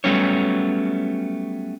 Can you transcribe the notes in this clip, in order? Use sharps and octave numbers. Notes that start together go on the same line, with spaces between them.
F#3 G3 A3 B3 C#4 C#5